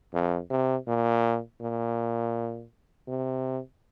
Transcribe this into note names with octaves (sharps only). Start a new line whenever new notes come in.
F2
C3
A#2
A#2
C3